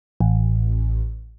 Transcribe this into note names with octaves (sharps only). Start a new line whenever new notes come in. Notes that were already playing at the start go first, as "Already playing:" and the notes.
A1